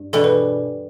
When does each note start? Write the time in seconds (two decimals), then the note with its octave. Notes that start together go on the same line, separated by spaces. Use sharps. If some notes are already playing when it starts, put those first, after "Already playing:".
Already playing: G2
0.13 E2 B2 G3 D4 A4
0.24 B4